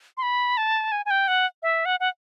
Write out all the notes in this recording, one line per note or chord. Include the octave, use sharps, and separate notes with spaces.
C6
B5
A5
G#5
G#5
G5
F#5
E5
F#5
F#5